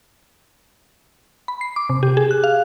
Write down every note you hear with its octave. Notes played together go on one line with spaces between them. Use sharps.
B5
C7
D6
C3
G4
G#4
F#6
F5